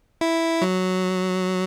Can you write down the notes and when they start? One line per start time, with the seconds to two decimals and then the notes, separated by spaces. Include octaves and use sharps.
0.21 E4
0.62 F#3